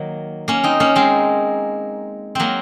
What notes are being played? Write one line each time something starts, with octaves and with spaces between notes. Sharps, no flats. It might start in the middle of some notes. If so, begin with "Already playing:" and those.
Already playing: D#3 F#3 A#3
A#3 C#4
C4 D#4
A#3 C#4
G#3 C4
F#3 A#3 C4